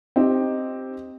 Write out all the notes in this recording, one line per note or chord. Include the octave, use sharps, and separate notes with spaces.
C4 D#4 G4